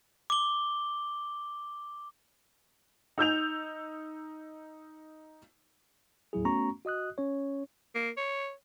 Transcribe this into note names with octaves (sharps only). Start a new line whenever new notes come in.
D6 G7
D#4 E6 G6 F7
D#2 A2 F#3 E4 G#4
A3 B3 C#4 F#4 A#5 C#6
F#4 D#5 D#6 F#6
C#4 C#5
A#3
C#5